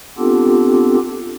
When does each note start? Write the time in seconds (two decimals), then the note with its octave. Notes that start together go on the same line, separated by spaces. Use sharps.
0.18 B3 C4 D4 F4 G4 A4